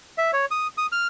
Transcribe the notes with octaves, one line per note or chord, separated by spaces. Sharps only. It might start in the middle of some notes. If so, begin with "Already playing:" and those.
E5
C#5
D#6
D#6
F6